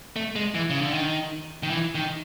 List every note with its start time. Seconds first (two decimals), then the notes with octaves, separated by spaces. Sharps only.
0.16 A3
0.36 G#3
0.55 E3
0.70 C#3
0.81 D3
0.94 D#3
1.63 D#3
1.70 E3
1.95 D#3